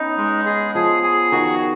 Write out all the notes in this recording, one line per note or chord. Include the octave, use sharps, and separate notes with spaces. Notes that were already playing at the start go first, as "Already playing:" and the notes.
Already playing: B3 C#4 D#4
G#3
G#4
F3 G#4
G#4
D#3 F#4